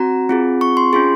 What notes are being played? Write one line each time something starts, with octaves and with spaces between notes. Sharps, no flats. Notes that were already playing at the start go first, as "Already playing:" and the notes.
Already playing: C4 F#4 A#5
C4 F4 G#4
C#6
C6
C#4 F4 G#4 C6